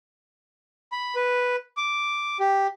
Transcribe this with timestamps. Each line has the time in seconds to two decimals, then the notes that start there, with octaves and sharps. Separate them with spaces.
0.92 B5
1.15 B4
1.77 D6
2.40 G4